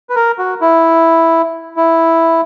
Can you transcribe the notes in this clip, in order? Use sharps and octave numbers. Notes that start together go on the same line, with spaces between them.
B4
A#4
F#4
E4
E4